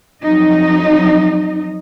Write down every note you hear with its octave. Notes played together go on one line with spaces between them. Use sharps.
F2 F#3 D#4 D#5